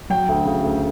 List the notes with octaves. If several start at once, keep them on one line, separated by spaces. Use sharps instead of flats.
F#3 G5
D2
C#3
D2